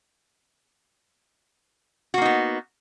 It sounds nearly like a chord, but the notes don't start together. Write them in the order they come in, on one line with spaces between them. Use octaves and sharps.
F#4 A#3 D#4 B3